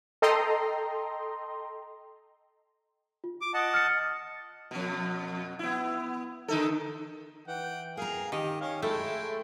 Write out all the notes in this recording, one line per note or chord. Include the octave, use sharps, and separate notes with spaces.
A4 D#5 G5 A#5 C6
F4
D6
D#5 F#5 A5
F6 A6 C#7
F2 B2
B3 E4
D3 D#4 A4
E3 F#5 G5
G#4 A#4 F5 A#5
D#3 G4 D#5
C#4 C#5 F5
G#3 A3 E4 A4 E5 G5